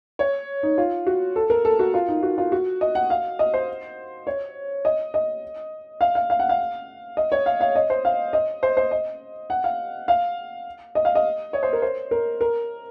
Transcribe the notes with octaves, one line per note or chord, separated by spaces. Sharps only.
C#5
D#4
F4
F#4
A4
A#4
A4
F#4
F4
D#4
F#4
F4
F#4
D#5
F#5
F5
D#5
C5
C#5
D#5
D#5
F5
F5
F5
F#5
F5
D#5
C#5
F5
F5
D#5
C5
F5
D#5
C5
C5
D#5
F#5
F5
F5
D#5
F5
D#5
C#5
C5
A#4
C5
A#4
A#4